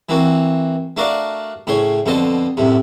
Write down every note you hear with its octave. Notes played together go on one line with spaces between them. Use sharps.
E3 A#3 C4 F#4
A3 D4 F#4 A#4 D5 F5
A2 C#3 C5 C#5
F2 B2 D3 C5 D#5 A5
F#2 A2 C3